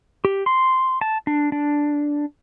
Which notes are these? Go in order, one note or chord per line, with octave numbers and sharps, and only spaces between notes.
G4
C6
A5
D4
D4